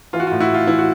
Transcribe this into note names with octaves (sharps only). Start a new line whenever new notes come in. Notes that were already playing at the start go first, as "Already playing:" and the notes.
E3 F4
F#4
A2 F4
E4 F#4
A2 F4
E3 E4
F#4